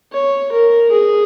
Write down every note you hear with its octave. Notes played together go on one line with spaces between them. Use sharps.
C#5
A#4
G#4